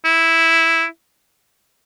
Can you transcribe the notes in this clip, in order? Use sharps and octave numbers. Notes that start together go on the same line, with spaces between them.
E4